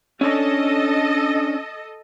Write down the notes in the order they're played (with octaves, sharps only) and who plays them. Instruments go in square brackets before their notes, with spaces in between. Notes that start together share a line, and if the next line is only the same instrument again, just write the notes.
[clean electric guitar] C#4 D4 [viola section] A4 D#5